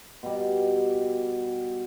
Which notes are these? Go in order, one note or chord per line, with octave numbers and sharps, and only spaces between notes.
B2 G3